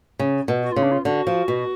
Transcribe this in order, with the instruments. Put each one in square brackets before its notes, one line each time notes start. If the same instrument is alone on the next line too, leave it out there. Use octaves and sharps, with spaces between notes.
[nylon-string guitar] C#3
B2
[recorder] F#4
[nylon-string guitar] C#3 [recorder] F4
[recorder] D4
F4
[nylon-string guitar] D3 [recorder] F#4
[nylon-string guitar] F3
B2